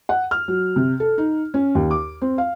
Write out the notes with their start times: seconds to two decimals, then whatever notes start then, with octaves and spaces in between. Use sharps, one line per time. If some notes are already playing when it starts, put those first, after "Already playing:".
0.09 F#5
0.31 F6
0.48 F#3
0.76 C3
1.00 A4
1.18 D#4
1.54 C#4
1.75 D#2
1.91 D6
2.22 C4
2.38 F5